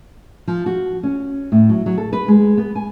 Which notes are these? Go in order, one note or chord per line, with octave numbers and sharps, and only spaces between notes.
F3
F#4
C#4
A2
F#3
F#3
A4
B4
G#3
B3
G#5